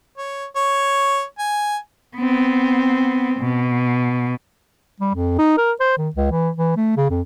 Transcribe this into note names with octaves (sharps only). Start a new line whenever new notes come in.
C#5
C#5
G#5
B3 C4
B2
G3
F2
D#4
A#4
C5
D#3
C#2
E3
E3
A3
C#3
F2